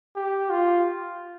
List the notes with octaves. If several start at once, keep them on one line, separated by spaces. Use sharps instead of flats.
G4
F4